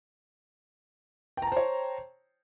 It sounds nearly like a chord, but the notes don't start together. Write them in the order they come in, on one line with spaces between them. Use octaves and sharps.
G5 A#5 A5 C5 C#5